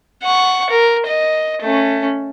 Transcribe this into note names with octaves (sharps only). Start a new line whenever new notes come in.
F#5 C#6
A#4
D#5
A3 C#4